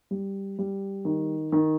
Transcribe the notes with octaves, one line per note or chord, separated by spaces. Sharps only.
G3
G3
D#3
D#3